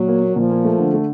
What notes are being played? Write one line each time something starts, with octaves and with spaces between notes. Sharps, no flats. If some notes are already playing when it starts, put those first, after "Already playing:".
Already playing: A#2 F#3
A#3
A#3
A#2 F3
A#3
A3
D3
A3